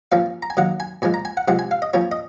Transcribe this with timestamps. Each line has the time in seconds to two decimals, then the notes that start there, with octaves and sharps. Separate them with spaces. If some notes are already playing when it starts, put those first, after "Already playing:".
0.12 F3 A#3 C#4 F5
0.43 A#5
0.50 G#5
0.57 D#3 F#3 A#3 F#5
0.80 G#5
1.02 A#2 F3 G#3 G#5
1.14 A#5
1.25 G#5
1.37 F#5
1.48 C3 F3 G#3 C4 F#5
1.59 G#5
1.71 F5
1.82 D#5
1.94 F3 A#3 C#4 C#5
2.12 D#5